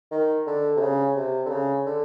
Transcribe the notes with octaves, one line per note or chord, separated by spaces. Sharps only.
D#3
D3
C3
C#3
C3
D3
C#3
D3